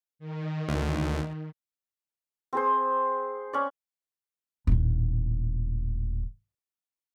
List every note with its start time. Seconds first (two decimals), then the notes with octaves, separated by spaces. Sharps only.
0.19 D#3
0.69 D2
2.53 C4 G#4 C5
3.53 C#4 D5
4.67 D#1 A2